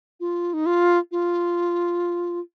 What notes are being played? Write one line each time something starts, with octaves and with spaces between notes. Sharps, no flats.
F4
D#4
F4
F4